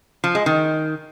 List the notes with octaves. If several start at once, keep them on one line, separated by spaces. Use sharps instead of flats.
F3
G#3
D#3